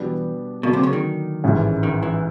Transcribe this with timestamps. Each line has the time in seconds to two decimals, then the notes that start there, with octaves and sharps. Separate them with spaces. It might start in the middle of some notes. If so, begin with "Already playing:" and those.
Already playing: B2 E3 G3 B3 D4 G4
0.63 B2 D3 F#3 A#3 D4
0.73 C3
0.83 C#3
0.93 D#3
1.44 A1 G#2 E3 G#3 C#4
1.83 D#3
2.03 E3